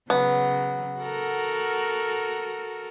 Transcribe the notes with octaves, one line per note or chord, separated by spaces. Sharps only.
C#3 F#3 B3
F#4 A4 A#4